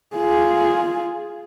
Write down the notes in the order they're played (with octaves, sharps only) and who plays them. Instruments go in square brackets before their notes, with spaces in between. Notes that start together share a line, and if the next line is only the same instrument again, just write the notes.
[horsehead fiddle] F4 G#4